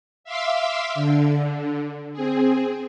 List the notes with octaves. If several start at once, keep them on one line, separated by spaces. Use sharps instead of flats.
E5 F5 C6 D6 E6
D3
C4 G#4